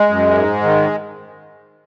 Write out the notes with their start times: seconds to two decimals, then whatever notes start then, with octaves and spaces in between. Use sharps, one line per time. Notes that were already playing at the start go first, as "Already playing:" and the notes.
Already playing: G#3
0.09 F#2
0.37 G#2
0.63 D#3